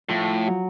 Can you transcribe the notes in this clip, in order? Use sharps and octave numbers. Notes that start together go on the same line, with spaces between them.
A2 F3
F#3